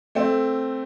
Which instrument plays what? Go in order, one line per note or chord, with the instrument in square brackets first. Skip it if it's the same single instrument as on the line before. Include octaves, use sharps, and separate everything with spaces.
[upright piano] A3 C4